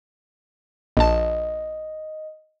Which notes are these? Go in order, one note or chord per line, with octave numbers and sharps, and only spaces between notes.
A#1 D#5 A5